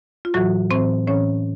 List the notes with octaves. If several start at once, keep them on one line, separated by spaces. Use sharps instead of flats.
F4
A2 E3 F#3 F#4
A2 E3 C4 C5
A2 E3 C#4 C#5